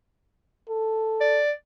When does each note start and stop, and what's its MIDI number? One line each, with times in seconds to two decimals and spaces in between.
0.69 1.40 69
1.21 1.51 74